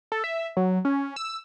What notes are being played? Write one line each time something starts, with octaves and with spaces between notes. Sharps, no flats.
A4
E5
F#3
C#4
E6